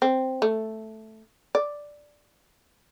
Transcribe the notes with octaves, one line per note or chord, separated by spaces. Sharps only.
C4
A3
D5